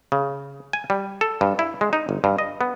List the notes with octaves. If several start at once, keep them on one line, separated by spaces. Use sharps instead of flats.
C#3
G#5
G3
A4
G2
E4
G#3
D#4
G1
G2
D#5
B3